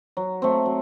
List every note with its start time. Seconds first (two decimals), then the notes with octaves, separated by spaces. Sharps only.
0.17 F#3
0.42 A3 C4
0.65 F#3